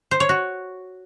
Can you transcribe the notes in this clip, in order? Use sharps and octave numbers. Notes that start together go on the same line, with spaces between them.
C5
C#5
F#4